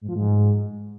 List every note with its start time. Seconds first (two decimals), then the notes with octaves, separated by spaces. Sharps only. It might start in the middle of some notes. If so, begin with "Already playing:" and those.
0.01 G#2
0.09 F3
0.16 G#2